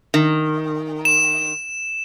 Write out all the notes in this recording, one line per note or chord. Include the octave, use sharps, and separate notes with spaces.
D#3
E7